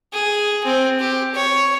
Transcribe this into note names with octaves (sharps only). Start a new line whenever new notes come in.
G#4
C4
G4
C#5